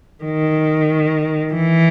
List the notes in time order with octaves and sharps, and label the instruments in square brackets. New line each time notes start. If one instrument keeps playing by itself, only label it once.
[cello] D#3
E3